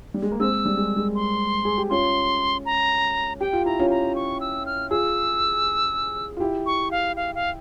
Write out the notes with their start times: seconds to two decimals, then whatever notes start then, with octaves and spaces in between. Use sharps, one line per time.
0.14 G3
0.22 G#3
0.32 A#3
0.40 G#3 C4 E6
0.65 G3
0.77 G#3
0.97 G#3
1.15 C6
1.65 G#4
1.78 G4
1.90 C#4 F4 C6
2.65 A#5
3.40 G4 G5
3.53 F4
3.65 E4 A#5
3.79 C#4 F4
3.90 A#5
4.15 C#6
4.41 E6
4.66 F6
4.90 F4 G#4 E6
6.37 F4
6.40 E4 G4
6.66 C#6
6.91 F5
7.16 F5
7.35 F5